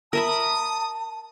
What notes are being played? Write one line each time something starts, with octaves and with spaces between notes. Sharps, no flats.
A#4 E5 A5 B5 D#6